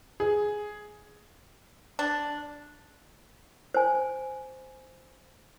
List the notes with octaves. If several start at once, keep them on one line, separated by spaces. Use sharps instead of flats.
G#4
D4
C5 G#5